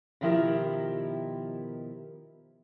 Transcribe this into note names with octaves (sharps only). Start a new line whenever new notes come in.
B2 D#3 F3 E4 G4 A#4